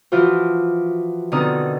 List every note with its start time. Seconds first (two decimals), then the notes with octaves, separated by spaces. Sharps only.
0.12 E3 F3 F4 F#4 C5
1.32 B2 D3 D#3 C4 D#4 D#6